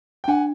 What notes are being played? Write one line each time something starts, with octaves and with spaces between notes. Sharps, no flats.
G5
D4 F#5 G#5